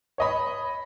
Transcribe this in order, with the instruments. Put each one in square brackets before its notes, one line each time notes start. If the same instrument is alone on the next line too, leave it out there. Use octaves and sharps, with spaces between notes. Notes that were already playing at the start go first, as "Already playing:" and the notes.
[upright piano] C#5 D#5 B5